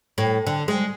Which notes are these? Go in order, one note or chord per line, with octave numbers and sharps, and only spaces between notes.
A2
D3
G#3